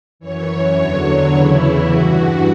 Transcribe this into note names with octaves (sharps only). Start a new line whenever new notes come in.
F#2 E3 C#5
E2 D3 F#3 C#5
E2 C#3 E3 E4
G2 E3 F#4